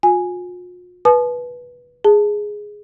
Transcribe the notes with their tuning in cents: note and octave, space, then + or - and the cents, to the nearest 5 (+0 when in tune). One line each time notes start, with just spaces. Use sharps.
F4 +45 G#5 +0
B4 -10 A5 -45 D#6 -35
G#4 +0 A5 +0